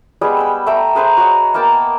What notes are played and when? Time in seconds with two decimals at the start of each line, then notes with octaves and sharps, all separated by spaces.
0.21 G3 G#3 B3 G#4
0.37 G5 E6
0.66 A3 E5 G5 A#5
0.95 G#4 B4 C5 A#5
1.17 F#4 C#5 D#5
1.54 A#3 B3 G5 A5